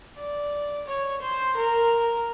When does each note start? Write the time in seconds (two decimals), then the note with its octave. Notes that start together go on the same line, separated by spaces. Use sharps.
0.17 D5
0.87 C#5
1.21 C5
1.56 A#4